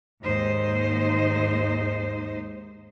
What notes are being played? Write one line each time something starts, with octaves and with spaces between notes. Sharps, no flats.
D#2 G#2 D#4 C5